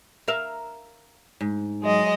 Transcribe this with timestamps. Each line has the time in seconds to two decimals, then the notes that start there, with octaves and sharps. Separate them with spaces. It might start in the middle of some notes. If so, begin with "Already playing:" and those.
0.28 A#4 E5 F5
1.41 G#2
1.81 F#3 G#3 D#5